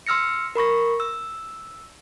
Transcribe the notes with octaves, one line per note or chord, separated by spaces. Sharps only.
C6 E6 F6 A#6 C#7
A#4 B5 C#6 A#6
E6